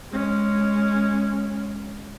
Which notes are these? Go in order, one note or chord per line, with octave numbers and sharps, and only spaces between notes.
G#3 C#4